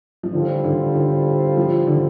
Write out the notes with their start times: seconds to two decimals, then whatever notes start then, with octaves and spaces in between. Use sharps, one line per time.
0.23 F3
0.33 A2 D3 G3 F4 A4 C5
0.64 D3
0.95 D3
1.57 F3
1.87 D3